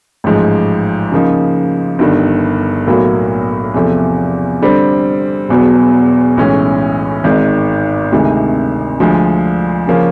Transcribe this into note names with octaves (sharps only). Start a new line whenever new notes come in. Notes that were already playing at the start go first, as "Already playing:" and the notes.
A1 G#2 F3
C#3 F3 A#3 D#4
G1 G2 D#3
B1 A2 F#3 A#3
E2 C3 F3 A3
D3 G3 C4
E1 E2 B2 F#3 B3
B1 A2 E3 G#3 C#4
G#1 G#2 D#3
D2 C3 D#3 G#3
D2 D3 F3 G#3
C#3 F3 A#3 C#4